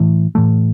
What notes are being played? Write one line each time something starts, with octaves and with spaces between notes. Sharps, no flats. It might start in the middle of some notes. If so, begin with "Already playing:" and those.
Already playing: A2 E3 A3
A2 E3 A3